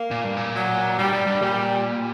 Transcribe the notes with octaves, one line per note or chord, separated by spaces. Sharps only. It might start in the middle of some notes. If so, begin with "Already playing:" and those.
Already playing: A#3
A#2
G2
A#2
F#3
G2 G3
G2
G2
A#2 G3